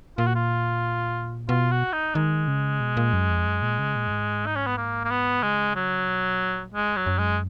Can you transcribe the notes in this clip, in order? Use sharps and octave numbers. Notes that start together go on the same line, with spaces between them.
A#2 F4
F#4
F4
B2 F4
F#4
D#4
D#3 G#3
C#3
B2
A#2
F#2
F2
F#2
A#2
C#3
A#2
F#2
G#2
D#4
C#4
B3
A#3
A#3
B3
C#3 G#3
F#3
B2
A#2
F#2 G#3
F#3
F#2
G#3